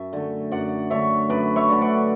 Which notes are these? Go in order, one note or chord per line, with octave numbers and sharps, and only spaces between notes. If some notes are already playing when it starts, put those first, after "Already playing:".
Already playing: F#2 E5
D3 A3
F#2 D5 F#5
D3 A3 C#5 E5
F#2 B4 D5
C#5 E5
D3 A3
D5 F#5